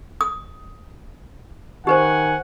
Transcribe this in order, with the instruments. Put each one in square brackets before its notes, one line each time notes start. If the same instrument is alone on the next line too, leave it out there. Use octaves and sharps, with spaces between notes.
[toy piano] D#6
[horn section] D#3 F#5 G#5 [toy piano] G4 B4 C5